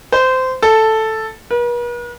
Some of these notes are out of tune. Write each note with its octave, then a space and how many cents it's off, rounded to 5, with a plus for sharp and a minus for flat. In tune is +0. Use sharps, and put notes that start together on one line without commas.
C5 -20
A4 +0
B4 -45